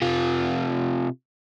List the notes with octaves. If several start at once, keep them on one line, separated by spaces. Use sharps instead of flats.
C3 F4